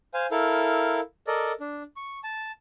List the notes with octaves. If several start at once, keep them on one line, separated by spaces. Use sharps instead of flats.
C5 F5 G#5
E4 A4 A#4 F5
A4 A#4 D5 D#5
D4
C#6
A5